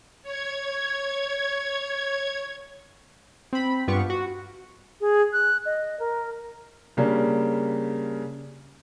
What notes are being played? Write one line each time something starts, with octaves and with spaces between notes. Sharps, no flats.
C#5 G#6
C4 B5
G2 B3 F4 G4 C#6
F#4
G#4
F#6
D#5
A#4
C#3 G3 A#3 C#4 D4